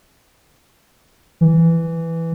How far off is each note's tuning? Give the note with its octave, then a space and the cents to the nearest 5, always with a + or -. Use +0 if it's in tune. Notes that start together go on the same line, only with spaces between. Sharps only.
E3 +5